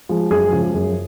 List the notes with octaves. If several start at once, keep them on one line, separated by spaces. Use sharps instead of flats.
F3 G#3
F#2 G#4
C#3 F3 G#3
F#2